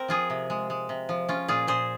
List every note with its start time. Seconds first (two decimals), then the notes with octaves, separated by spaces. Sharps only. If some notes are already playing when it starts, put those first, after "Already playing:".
Already playing: C4 A#4 C5
0.08 F3 F4 G#4
0.30 C3
0.50 G#3
0.70 G#3
0.89 C3
1.09 F3
1.28 C#4 F4
1.48 A#2 F4 G#4
1.67 A#2 G#4 C5